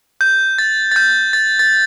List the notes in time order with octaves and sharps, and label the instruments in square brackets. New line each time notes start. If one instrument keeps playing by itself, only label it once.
[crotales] G6
A6
A6
G6
A6
A6